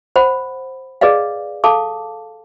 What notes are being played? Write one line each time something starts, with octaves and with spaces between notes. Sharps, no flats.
C5 F#5 B5
G#4 B4 D5 D#5 F5
A4 F5 A5 D6